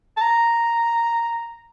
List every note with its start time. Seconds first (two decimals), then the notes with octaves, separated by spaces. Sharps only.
0.17 A5
0.22 A#5